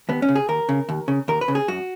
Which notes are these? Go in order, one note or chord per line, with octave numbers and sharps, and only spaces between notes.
D#2 B3
C#4
C#3
G#4
D#2 A#4
C#3
D#2
C#3
D#2 A#4
B4
C#3
G#4
F#2 F#4